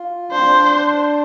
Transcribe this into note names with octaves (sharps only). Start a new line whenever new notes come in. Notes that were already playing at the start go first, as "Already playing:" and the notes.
Already playing: F4
D4 C5
C4
D4